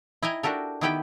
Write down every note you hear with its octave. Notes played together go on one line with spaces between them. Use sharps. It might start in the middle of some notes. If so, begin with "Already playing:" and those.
E4 D#5 G5 G#5 A#5
D4 F#4 G4 A4 A#4
D#3 B3 E4 G4 B4 G5